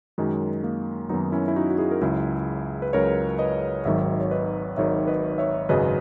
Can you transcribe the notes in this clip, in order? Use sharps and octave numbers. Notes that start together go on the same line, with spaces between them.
F#2 D#3 F#3 G#3
A#3
F#2 D#3 F#3 B3 D#4
C#4 E4
E4
D#4 F#4
F#4
E4 G#4
A#4
C#2 C#3 F#3 E4 G#4
B4
C#2 C#3 F#3 A#4 C#5
B4 D#5
G#1 G#2 D#3 F#3 C#5 E5
C#5
B4 D#5
G#1 G#2 D#3 F#3 C#5 E5
B4 D#5
C#5 E5
G#1 F#2 C#3 F#3 B4 D#5